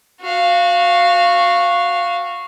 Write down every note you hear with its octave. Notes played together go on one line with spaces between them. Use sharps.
F#4 F5